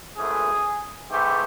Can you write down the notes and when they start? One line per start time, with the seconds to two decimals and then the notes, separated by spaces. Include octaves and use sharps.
0.16 G#1 G#2 E3 A3 G#4
1.10 G#2 E3 A3 C4 G4